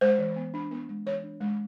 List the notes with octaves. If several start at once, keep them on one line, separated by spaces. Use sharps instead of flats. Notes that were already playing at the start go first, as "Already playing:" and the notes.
G#3 C5
E3
B3
D4
B3
G#3
E3 C#5
D4
G#3